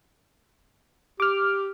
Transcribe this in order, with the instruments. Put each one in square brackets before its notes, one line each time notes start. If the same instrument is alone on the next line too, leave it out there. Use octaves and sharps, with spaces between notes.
[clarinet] G4 [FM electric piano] D6 F6